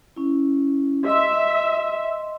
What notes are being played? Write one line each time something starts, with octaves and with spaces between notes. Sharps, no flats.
C#4 E4
D#5 E5 C6